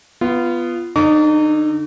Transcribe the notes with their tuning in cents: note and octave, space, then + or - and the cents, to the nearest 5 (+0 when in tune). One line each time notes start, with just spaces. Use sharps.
B3 +0 F4 -20
D3 +0 D#4 -30 D6 -45